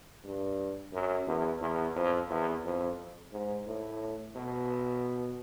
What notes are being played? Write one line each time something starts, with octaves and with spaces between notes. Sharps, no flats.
G2
F#2
E2
E2
F2
E2
F2
G#2
A2
B2